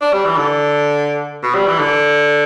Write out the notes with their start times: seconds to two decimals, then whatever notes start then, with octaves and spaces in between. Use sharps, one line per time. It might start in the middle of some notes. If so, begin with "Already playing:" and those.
0.01 D4
0.13 G3
0.25 E3
0.37 D3
1.43 B2
1.55 G3
1.67 E3
1.79 D3